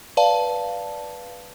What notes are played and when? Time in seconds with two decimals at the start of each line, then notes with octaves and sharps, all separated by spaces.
0.17 B4 D5 F5 A5